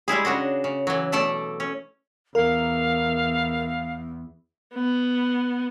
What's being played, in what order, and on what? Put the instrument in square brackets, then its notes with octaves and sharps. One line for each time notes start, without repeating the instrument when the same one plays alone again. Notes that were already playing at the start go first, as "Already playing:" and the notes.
[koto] G3 G#3 E4 G#4
C#3 D4 F#4 D#5
C#3
E3 F#3
B2 A3 A4 D5 A5
C#4
[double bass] E2 [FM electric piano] A#4 [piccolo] F5
[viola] B3